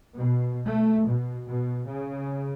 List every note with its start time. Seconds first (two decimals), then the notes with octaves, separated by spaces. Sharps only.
0.17 B2
0.67 A3
1.08 B2
1.49 B2
1.89 C#3